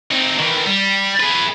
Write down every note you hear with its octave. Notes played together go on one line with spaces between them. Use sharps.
C4 D#4
D#3 E3
G3
G#4 B4